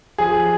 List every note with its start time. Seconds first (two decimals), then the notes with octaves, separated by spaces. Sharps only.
0.18 F3 G#4